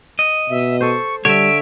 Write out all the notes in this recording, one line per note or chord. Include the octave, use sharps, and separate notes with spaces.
D#5
B2 E5
A4 C5 C#6
D3 G3 C#5 E5 D7